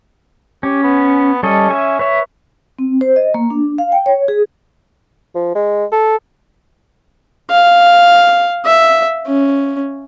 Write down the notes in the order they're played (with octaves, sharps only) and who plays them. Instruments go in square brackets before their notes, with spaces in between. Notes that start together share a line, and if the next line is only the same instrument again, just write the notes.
[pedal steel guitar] C#4 [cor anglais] G4
[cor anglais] B3
[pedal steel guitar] G3 A4 D#5 [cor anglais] C#4
[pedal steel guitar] E5 G#5
[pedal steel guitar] B4 E5 [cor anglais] C#5
[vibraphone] C4
C5
D#5
A#3
D4
F5
G5
C#5
G#4
[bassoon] F3
G#3
A4
[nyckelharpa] F5
E5
C#4